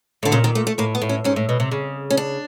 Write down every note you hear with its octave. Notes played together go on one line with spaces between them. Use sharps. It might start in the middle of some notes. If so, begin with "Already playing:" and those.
A2 D3
A#2 C#3
D#3
A3
A3
A2 A#3
B3
A2
C#4
G#2 C#4
A2
B2
C3
C#3
C#4
D4